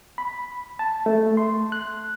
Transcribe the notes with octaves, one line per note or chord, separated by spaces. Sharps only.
B5
A5
A3
C6
F#6